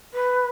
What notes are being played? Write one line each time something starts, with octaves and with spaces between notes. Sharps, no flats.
B4